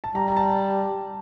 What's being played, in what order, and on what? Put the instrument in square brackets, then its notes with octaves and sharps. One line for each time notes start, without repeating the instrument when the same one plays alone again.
[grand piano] A5
[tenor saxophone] G3 [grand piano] A#5
[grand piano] A#5
A5